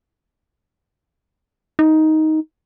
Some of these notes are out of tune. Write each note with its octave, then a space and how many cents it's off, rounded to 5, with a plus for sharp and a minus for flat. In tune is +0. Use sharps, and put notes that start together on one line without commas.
D#4 +10